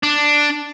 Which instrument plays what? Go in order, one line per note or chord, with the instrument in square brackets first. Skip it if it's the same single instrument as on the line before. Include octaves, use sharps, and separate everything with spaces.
[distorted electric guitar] D4